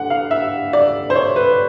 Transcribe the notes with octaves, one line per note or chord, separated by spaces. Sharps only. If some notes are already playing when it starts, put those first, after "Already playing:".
Already playing: D3 F#5
F5
E5
D5
C5
C#5
B4